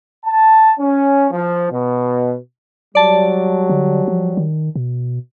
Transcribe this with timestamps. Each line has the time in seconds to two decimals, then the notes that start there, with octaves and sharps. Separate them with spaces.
0.24 A5
0.79 C#4
1.31 F3
1.72 B2
2.95 F#3 G3 D5 A5
3.70 D3
4.08 F3
4.37 D#3
4.76 B2